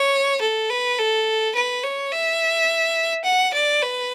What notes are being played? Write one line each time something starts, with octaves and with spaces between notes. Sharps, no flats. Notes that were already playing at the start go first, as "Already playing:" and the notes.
Already playing: C#5
A4
B4
A4
B4
C#5
E5
F#5
D5
B4